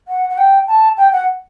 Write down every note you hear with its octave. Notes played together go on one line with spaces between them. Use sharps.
F#5
F#5
G5
A5
G5
F#5